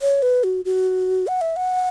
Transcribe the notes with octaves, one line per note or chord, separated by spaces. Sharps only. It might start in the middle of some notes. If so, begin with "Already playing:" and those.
C#5
B4
F#4
F#4
F#5
E5
F#5